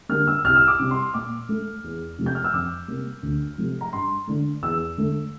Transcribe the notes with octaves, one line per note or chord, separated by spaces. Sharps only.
D3 G3 A#3 F6
E6
C2 F6
E6
D6
C3 G3
C6
A#2 D6
A3
E2
C3 F3 A3
G6
F6
E6
F2 D6
C3 G3 A#3
D2
C3 F3 A3
A#5
G2 C6
D3 A3
E2 E6
D3 A3